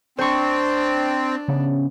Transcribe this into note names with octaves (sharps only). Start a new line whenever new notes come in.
C4 D4 C5 C#6
C#3 B3 C#4